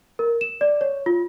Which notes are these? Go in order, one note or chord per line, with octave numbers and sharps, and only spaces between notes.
A#4
E7
D5
C#5
F4